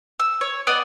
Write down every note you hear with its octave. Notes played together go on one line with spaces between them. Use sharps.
E6
C#5
B3 D5 D#5 D#6